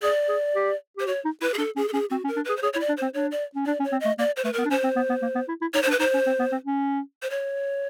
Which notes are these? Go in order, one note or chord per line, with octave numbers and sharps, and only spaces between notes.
G#4 D5
G#4
G4
G4 C5
F#4 C#5
D#4
E4 B4
G#4
D4 A4
C#4 G#4
A4
C#4 G#4
C4 F#4
C#4
A#4
D4
G#4 B4
C5
G#4 C#5
C#5
E4
D5
D4
C4 C5
D4 C#5
D5
C#4
D4 D5
C#4
C#5
C4
A3 D#5
A#3 D5
C5
A3 B4
B3 A#4
D4
C#4 C5
C4
B3
B3
A#3
B3
E4
E4
D#4 C#5
C5
D4
B4
D#4 C5
C#4
C4
B3
C4
C#4
C5
C#5